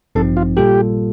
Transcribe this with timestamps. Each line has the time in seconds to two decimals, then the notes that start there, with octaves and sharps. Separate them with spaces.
0.15 A1 G2 F3 C4 D#4 A4
0.37 F4
0.57 A#2 G3 A#3 F4 G4 A4